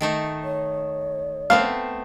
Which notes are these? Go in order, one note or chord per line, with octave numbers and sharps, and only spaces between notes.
D#3 A3 D#4
C#5
A3 B3 C4 F5